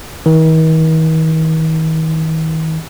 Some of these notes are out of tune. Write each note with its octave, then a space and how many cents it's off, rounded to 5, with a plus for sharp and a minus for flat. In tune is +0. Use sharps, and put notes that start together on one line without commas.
D#3 +45